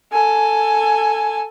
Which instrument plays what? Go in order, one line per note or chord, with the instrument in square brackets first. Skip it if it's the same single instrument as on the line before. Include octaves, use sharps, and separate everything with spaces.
[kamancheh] A4 G#5